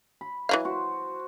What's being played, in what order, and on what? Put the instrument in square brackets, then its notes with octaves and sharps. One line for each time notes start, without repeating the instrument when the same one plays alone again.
[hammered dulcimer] B5
[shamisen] E3 F#3 F5
[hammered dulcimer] F#4 C5